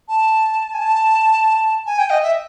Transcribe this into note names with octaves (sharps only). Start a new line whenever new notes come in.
A5
G#5
A5
G#5
G5
D#5
E5